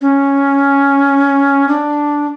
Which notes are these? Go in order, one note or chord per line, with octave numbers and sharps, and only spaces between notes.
C#4
D4